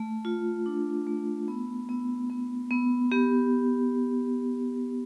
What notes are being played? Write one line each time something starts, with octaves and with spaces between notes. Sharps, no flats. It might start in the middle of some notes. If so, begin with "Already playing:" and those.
Already playing: A3
F4
D4
A3
B3
B3
B3
B3
B3 G4